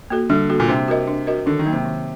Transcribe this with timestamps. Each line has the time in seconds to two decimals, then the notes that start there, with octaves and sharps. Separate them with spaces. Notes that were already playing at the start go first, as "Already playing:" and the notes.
0.10 A#3 F#4 A4
0.30 D3 G3
0.49 A#3 F#4 A4
0.60 A#2
0.68 C3 D4
0.88 F#4 A#4 D#5
1.08 D4
1.27 F#4 A#4 D#5
1.46 D3 D#3
1.59 D#3
1.66 F#3 A#3 D#4
1.73 C3
1.85 D#3